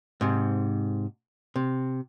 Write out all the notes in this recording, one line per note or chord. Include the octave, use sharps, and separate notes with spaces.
G#2 C3
C3